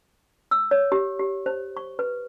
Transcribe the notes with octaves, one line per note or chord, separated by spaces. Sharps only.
E6
C#5
G4
G4
C5
C#6
B4